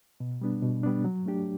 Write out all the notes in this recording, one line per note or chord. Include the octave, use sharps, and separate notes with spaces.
B2
G3 B3 D4
B2
G3 B3 D4
F#3
A3 D4 G4